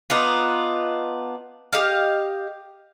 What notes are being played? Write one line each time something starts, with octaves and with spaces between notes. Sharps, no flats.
B3 D4 D#4 F4
G4 D#5 F5